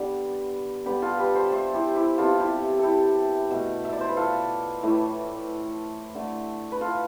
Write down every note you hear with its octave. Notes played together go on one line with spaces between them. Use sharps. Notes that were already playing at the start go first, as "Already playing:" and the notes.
Already playing: D3 G3 B3
D3 G3 B3 G4 B4
F4 A4
G4 B4
A4 C5
C5 E5
E4 G4
E4 G4
C3 G3 B3 F4 A4
E4 G4
A4
E4 G4
B2 A3
E5
D5
C5
B4
F4 A4
A2 E3 A3
D3 A3
B4
F4 A4